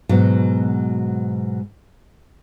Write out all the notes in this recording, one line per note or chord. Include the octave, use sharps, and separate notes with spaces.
G#2 B2 F#3